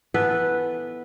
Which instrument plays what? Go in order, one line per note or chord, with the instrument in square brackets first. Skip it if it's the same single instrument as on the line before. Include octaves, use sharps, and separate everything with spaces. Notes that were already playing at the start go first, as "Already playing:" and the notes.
[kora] E3 B3 A4 B4